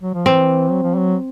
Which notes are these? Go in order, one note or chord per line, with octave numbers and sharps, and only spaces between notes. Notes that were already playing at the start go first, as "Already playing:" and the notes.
F#3
F3
E3 C4
F#3
F3
F#3